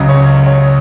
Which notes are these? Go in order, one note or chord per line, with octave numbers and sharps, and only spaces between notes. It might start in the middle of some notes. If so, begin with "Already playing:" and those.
Already playing: C#2 C#3 F#3
C#5
C#5